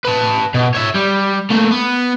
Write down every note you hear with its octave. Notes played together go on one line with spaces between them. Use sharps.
B4 A5
B2
C#5 E5
G3
A3 A#3
B3